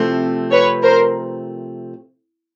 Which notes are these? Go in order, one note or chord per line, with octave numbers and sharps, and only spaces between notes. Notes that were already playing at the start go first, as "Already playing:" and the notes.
Already playing: C3 F3 A3 C4
B4 C#5
A#4 C5